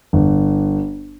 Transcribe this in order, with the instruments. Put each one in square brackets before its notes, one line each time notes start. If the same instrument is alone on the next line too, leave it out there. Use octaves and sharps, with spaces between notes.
[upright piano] G1